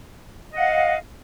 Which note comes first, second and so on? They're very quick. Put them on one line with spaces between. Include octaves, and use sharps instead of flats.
D#5 F#5 F5